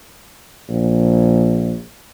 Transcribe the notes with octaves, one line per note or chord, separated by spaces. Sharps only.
A#1